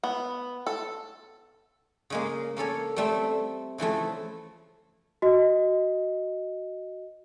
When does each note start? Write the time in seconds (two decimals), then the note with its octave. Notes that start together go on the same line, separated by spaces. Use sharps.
0.04 B3
0.67 A4
2.10 C#3 G#3 A#3
2.56 A#3 C#4 A4 C#5
2.96 G3 A3 C4
3.78 C#3 E3 F3 A3
5.22 F#4 D#5